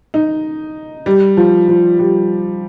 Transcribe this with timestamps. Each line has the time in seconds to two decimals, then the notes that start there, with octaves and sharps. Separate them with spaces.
0.14 D#4
1.06 G3
1.37 F3
1.69 F3
1.99 G3